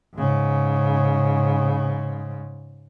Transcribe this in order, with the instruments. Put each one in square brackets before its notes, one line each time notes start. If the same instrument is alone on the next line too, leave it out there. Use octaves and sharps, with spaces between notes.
[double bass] G#2 C#3